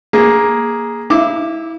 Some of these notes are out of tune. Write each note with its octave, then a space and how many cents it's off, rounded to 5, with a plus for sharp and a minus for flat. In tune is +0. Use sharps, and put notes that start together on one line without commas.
A#3 +10 G#4 -5
E4 -20 F5 -40 D6 +0